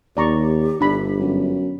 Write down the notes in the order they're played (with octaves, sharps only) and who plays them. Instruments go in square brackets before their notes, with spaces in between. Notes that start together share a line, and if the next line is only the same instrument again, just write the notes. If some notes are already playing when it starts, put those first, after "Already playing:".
[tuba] D#2 [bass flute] G4 [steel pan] D5 A#5 C#6
[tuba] G1 [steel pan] D4 B5
[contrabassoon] F#2